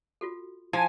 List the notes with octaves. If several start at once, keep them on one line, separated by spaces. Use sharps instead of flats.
F4 F#4 A4
F3 E4 F4 G#5 A5